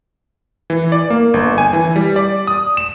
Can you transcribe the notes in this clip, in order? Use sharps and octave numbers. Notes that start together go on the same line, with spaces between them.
E3
D5
A#3
G1
G#5
E3
G3
D5
D#6
E7